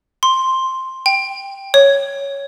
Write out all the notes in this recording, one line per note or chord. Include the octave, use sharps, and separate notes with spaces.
C6
G5
C#5